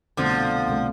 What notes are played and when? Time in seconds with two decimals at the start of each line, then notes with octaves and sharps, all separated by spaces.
0.17 C2 B2 D3 F3 A3
0.67 C2 B2 A3